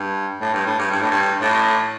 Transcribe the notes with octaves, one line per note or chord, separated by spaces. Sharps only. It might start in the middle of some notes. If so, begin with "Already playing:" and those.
Already playing: G2
A2
G2
A2
G2
G2
A2
G2
A2